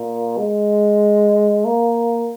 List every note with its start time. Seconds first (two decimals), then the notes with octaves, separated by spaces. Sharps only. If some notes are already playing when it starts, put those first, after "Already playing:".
Already playing: A#2
0.38 G#3
1.65 A#3